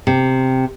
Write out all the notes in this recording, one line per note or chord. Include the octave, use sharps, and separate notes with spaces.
C3